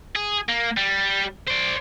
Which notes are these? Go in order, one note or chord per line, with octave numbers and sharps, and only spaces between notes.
G#4
A#3
G3
C5 D5